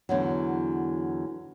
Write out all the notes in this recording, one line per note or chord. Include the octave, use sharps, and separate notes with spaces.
E2 D3 F#3